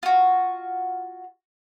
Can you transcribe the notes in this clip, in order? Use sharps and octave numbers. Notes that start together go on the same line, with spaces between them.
F4 F#4